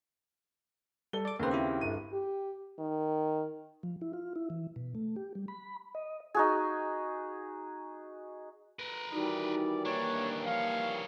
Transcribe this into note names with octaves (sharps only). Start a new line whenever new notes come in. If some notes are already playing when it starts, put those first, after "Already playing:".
G3 A4 G7
D5 D6
D#2 C#3 A#3 C4 B4
E4 G4
G1 D#7
G4
D#3
F3
E4
F4
E4
E3
B2
A3
G4
G3
B5
D#5
D#4 F#4 G#4
A#4 B4
D#3 E3 G3 D#4 E4 F#4 D5
D#2 A#3 D4 C#5
F3 C#5 F5